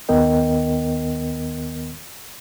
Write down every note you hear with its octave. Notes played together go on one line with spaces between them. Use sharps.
D#2 D#3 B3 A#4 D#5 G5